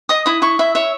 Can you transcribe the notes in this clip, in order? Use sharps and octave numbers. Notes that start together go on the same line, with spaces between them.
D#5 D#6
E4 D#6
E4 C#6
E4 E5
C#5 E5